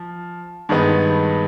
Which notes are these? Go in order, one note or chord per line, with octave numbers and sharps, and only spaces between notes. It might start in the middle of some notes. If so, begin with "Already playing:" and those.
Already playing: F3
G2 D#3 G#3 B3